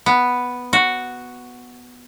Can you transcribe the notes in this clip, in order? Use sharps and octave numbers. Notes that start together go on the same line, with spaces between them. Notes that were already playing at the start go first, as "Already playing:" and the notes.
B3
F#4